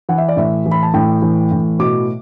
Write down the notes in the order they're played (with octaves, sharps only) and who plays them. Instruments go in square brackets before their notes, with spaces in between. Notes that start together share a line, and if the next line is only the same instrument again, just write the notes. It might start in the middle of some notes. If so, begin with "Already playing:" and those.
[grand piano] E3 F#5
E5
D5
A2 E5
E3
B5
A5
A2 G5
E3
A2
B2 D6